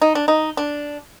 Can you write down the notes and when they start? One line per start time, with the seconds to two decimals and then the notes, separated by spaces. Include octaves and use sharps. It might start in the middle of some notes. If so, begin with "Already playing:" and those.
0.02 D#4
0.15 D4
0.28 D#4
0.57 D4